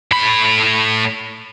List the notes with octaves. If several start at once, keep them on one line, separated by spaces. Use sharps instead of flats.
A2 B5